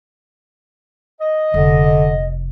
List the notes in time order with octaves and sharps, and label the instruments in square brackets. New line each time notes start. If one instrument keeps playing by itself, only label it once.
[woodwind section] D#5
[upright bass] F1 [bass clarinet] D3